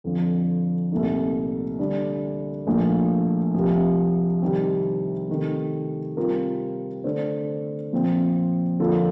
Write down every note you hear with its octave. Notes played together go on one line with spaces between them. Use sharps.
F2 D3 F3
C2 A#2 A3 D#4
D3 G3 D4
A#1 A2 F3 A#3
C2 C3 F3
C3 D#3 G3 C4
C3 D#3 A3
C3 G3 C4 F4 A#4
D3 A3 D4 A4 C5
A#2 F3 C4
D3 F3 A#3 F4 A4